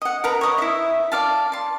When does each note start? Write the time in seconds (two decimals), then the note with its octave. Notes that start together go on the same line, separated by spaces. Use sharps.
0.02 D#5 F#5
0.24 A#4 B4 A#5
0.41 C#5 D#5
0.58 E4 E5
1.12 D5 F5 A5
1.52 A5 C6